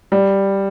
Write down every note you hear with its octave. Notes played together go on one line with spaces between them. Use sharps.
G3